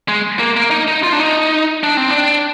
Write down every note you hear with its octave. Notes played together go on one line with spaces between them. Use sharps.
G#3
A#3
A#3
D#4
D#4
F4
D4
D#4
D4
C4
D4